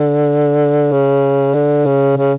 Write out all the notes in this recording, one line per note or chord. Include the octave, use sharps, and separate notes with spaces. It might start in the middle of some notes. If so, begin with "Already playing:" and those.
Already playing: D3
C#3
D3
C#3
C#3